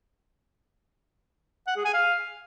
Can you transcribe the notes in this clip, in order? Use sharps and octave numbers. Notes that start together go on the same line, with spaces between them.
F#5
G#4
G#5
F5